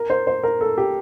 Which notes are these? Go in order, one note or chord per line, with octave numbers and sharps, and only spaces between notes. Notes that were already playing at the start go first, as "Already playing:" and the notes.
Already playing: A#4
C5
C5
A#4
A4
G4